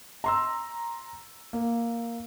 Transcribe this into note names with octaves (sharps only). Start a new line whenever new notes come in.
A#5 C6 E6
A#3